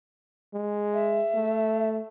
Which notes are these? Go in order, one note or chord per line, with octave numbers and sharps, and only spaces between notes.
G#3
E5
A3